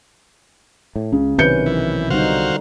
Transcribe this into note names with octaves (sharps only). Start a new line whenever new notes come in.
A2
C#2 C#3
B1 C3 D#3 C#4 B4 G6 C#7
E3
D3 G3 D#4 F#4 C5 F5